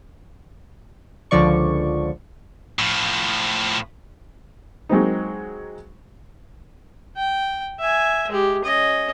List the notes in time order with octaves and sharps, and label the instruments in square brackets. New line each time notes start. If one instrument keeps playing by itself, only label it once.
[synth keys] C#2 D3 F3 D5 C#6
[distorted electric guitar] A2 F3
[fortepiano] F#3 G#3 C4 D#4
[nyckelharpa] G5
E5 G#5
G#3 G4
C#4 D#5